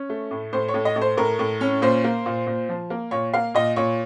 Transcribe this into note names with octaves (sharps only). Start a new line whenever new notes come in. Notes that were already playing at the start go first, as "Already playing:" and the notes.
Already playing: C#4
A3
A2
A2 C5
C#5
A2
D#5
A2
C5
A2 A#4
A2
C#4
A#2 C5
A#3
A#2
A#2
F3
A#3
A#2 C#5
A#3 F5
A#2 D#5
A#2 C#5